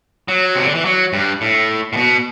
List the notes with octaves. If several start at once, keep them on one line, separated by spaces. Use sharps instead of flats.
F#3
C3
D3
E3
F#3
G2
A2
A2
B2